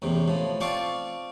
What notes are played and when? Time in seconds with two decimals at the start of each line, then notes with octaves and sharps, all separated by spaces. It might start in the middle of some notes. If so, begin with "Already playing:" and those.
0.02 A1 E2 C3
0.28 A2 F3
0.60 C4 F4 D5 F5 A5 C#6